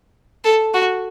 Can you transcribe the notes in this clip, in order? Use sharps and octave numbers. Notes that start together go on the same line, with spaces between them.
A4
F#4